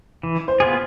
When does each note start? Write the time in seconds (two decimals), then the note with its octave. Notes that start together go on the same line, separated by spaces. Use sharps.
0.23 E3
0.48 C5
0.60 B3 F4 G#4